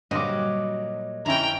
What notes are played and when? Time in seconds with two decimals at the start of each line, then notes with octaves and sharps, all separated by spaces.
0.11 G2 A#2 D3 F#3 G3 D#5 C6 D6
1.26 F2 D3 C#4 E4 G5 A#5